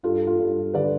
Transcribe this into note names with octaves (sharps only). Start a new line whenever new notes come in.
G2 F4 A4
F4
G2
D3 B4 D5